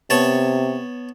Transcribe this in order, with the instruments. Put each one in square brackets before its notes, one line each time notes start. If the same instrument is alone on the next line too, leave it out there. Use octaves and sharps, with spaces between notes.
[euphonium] C3 [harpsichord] B3 C#5 A5